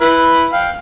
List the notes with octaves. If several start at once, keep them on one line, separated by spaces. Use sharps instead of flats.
E4 B4
F5 G5